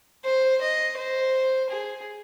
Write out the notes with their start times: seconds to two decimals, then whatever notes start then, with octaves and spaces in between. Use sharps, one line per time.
0.24 C5
0.61 D#5
0.97 C5
1.70 G#4